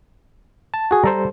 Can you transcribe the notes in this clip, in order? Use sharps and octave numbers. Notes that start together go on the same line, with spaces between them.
A5
F#4 G#4
G3 A4 C5 A#5